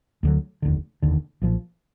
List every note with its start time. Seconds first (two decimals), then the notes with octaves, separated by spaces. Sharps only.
0.23 D2 D3 F#3
0.62 F1 D#2 D3
1.02 F1 D#2 D3
1.42 B1 A#2 F3